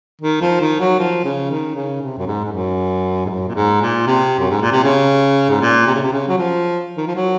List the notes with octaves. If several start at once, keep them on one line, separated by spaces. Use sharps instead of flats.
D#3
F3
D#3
F#3
F3
C#3
D#3
C#3
C3
F#2
G#2
G#2
F#2
G#2
F#2
A#2
G#2
A#2
C3
F#2
G#2
A#2
C3
C#3
G#2
A#2
C3
C#3
C3
C#3
F#3
F3
D#3
F3
F#3